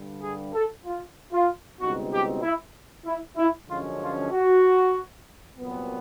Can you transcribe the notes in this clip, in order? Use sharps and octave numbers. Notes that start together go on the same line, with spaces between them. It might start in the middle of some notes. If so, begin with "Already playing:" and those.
Already playing: G2 D3 G3
G#4
A4
F4
F4
C#2 B2 G3 C4 D#4 F#4
G4
E4
E4
E4
F#2 D3 F3 G#3 C#4 F4
F4
F#4
C2 A#2 F#3 B3